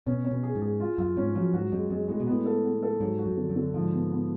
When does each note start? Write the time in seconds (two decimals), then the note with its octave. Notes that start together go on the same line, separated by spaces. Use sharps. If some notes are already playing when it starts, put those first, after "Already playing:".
0.06 B2 C#4
0.25 C#4
0.31 B2
0.43 G#4
0.55 G#2
0.62 G#4
0.80 F4
0.98 F#2 F4
1.16 G#2 C#4
1.35 F3 F#3
1.53 G#2 F#4
1.72 F#2 G#3
1.90 F#2 G#3
2.08 A2 G#3
2.20 B2
2.27 A2 B3
2.46 A4
2.64 B3
2.83 A4
3.01 G#2 F#3
3.19 F#4
3.26 F#2
3.37 D3
3.49 F#2
3.56 D3
3.74 G#2 F3
3.93 B3
4.11 B3